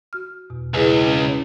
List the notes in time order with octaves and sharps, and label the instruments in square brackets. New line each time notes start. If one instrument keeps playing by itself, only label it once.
[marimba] F#4 F6
E2 B2
[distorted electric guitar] C#2 [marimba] E4 G#4 B4
[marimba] C#4